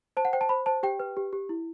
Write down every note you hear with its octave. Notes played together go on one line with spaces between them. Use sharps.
C5 A5
F#5
C5 G5
A5
C5 B5
C5 A5
G4 G5
B4
G4
G4
E4